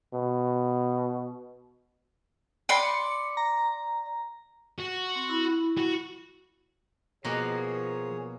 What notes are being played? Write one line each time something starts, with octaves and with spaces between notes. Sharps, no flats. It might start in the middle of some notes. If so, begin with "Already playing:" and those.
B2
D5 B5 C6 C#7
A#5
F#4
C4
E4 B5
F#4
B2 F3 A#3 G#4 C#5 A#5